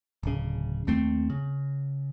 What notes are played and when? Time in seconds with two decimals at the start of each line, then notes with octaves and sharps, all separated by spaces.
0.23 D1 C#3
0.87 D#2 A3 C4
1.30 C#3